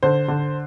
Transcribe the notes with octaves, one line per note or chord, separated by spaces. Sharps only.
D3 C5
D3